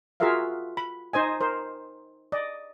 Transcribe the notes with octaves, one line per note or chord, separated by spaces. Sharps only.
F4 F#4 G#4 A#4 E5 F5
B5
D#4 C5 D#5 G#5
A#4 C5
D5 D#5